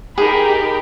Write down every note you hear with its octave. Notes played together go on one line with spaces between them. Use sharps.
D#4 G4 G#4 A#4 B5